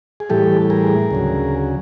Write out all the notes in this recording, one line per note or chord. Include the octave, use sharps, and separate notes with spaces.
G#4
A2 E3 G3 G4 A4
G#4 A#4
D2 C#3 F#3